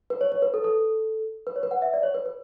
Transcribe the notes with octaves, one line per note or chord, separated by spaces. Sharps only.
B4
C#5
C#5
B4
A4
A4
B4
C#5
B4
F#5
E5
D5
C#5
B4
B4